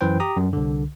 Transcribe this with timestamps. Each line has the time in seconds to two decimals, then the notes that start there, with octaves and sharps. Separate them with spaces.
0.01 F#2 E3 B4 C5 G5
0.20 G4 A#5 D#6
0.37 F#2
0.53 C2 D3